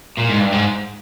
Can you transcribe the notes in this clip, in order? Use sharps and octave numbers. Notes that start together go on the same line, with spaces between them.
A#2
G#2
G2
G#2